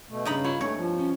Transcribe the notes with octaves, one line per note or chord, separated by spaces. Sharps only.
B2 A3
G2 C#3 D#4 B5
F4 C#5 F5 B5
A3 C4 D4 C#5
F3
C#4